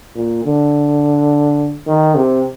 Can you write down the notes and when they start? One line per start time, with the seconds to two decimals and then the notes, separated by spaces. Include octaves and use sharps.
0.15 A#2
0.44 D3
1.87 D#3
2.15 C3